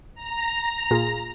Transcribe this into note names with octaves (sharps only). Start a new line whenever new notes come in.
A#5
A#2 F4 G#4